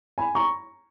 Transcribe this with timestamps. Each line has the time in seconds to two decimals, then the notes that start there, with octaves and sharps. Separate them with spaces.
0.18 G#5 B5
0.35 A#5 C#6